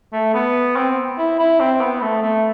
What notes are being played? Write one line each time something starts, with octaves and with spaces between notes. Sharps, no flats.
A3
B3
C4
E4
E4
C4
B3
A3
A3